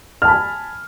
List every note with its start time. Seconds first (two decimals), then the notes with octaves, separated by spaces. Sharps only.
0.22 F6
0.25 A5
0.28 B5
0.31 G#5